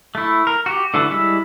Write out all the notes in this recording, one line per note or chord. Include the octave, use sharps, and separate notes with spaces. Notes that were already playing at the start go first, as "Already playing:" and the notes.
A3 E4
A#4
F#4 G4
D3 E3 A3 F#4 A5
G3 G#3 E4 E5